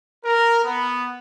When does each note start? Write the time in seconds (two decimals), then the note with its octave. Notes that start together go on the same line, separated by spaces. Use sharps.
0.24 A#4
0.64 B3